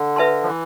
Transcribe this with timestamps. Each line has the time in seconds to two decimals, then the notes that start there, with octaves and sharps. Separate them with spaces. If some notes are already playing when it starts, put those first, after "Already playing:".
Already playing: D3
0.16 B4 E5 A5 C6
0.43 F3
0.47 E3